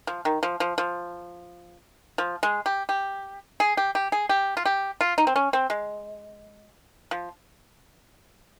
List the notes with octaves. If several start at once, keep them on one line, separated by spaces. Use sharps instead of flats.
F3
D#3
F3
F3
F3
F3
G#3
G4
G4
G#4
G4
G4
G#4
G4
F4
G4
F4
D#4
C4
C#4
C4
G#3
F3